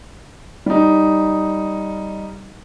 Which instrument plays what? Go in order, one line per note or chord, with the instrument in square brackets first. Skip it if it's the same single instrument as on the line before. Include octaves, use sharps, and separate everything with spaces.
[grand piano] G3 D#4